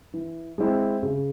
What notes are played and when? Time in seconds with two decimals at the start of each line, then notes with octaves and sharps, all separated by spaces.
0.14 E3
0.58 G#3 C4 E4
1.03 C#3